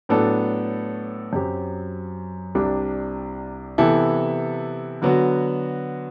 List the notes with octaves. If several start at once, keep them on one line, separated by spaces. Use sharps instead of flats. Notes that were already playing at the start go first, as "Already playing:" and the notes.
A2 F#3 B3 D4 A4
F#2 F#3 C4 G4
C2 C3 G3 D4
C3 E3 B3 E4 A4
D3 F#3 B3 F#4